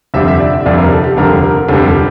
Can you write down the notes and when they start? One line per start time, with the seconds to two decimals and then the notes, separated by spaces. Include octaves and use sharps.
0.14 F1 F2 D3 G3 E5
0.28 E5
0.40 D5
0.53 E5
0.66 F1 F2 D3 G3 D5
0.79 A#4
0.92 A4
1.04 G4
1.17 F1 F2 D3 G3 A#4
1.43 A#4
1.69 F1 F2 D3 G3 A4
1.86 A4